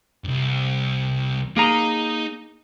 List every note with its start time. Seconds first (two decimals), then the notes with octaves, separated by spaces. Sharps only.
0.24 C2 G2
1.57 A#3 D#4 G#4 A#5